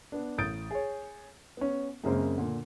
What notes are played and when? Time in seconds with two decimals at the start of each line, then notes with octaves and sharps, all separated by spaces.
0.12 B3 D4
0.38 A1 D#6 G6 A6 D7
0.71 G#4 C#5
1.57 B3 C#4
2.04 F#2 C#3 G#3 A#3 C4
2.38 A#2 D3